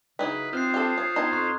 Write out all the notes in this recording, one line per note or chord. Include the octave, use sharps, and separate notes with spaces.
C#3 F#3 D#4 E4 B4
C4 F4 C5 D#6 F#6 C7
G4 A4
C#5 D#6
B3 D#4 A5 A#5 C6 G#6
F2 C6 C#6 F#6